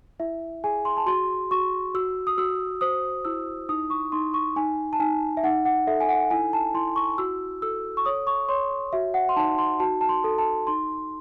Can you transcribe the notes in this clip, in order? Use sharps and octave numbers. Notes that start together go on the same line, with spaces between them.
E4 E5
G#4 G#5
C6
A5
F#4 C6
F#4 C#6
F#4 E6
D#6
F#4 E6
C5 D#6
E4 E6
D#4 D#6
C#6
D#4 C6
C#6
D#4 G#5
A5
D#4 G#5
E5
D#4 F#5
F#5
A4 E5
G#5
F#5
E4 G#5
A5
E4 C6
C#6
F#4 E6
A4 E6
C#6
C#5 D#6
C#6
C#5 C6
F#4 E5
F#5
C6
D#4 A5
C6
F#4 A5
A5
C6
A4
A5
D#4 C6